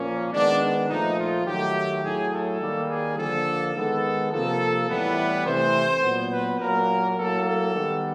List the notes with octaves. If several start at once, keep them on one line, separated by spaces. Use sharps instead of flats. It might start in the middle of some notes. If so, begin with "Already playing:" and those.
Already playing: A#2 F3 A#3 C#4
D#3 G#3 B3 D4
D4
A#2 F3 A3 D#4
F4
D#3 F#3 A3 G4
A2 F#3 A3 G#4
A4
D#3 G3 A#3
G#4
D3 F3 A#3 A4
D#3 G#3 B3 A4
C3 F3 A#3 A4
A2 E3 G3 B3 B4
C3 E3 A3 C5
A#2 F#3 B3
B4
A#2 F#3 A#3 A#4
A2 F#3 A#3 A4
A4
D#3 G3 B3